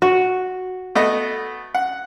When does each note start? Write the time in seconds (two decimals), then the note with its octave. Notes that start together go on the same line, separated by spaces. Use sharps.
0.02 F#4
0.95 A3 B3 D#5
1.75 F#5